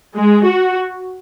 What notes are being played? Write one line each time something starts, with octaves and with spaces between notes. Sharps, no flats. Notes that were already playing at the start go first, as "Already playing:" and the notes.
G#3
F#4